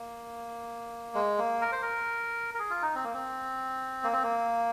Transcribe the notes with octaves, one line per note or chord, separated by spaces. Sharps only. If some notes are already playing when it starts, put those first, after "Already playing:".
Already playing: A#3
G#3
A#3
A#4
C5
A#4
A#4
G#4
F4
D#4
C4
A#3
C4
A#3
C4
A#3